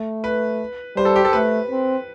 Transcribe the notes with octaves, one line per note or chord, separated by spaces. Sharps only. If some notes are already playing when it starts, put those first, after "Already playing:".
Already playing: A3
B4
G3 C5
A4
G4
A4
A3 B4
C4